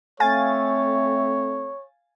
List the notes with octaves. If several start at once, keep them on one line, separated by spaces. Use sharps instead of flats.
A3 C4 C#5 F5 G#5 A6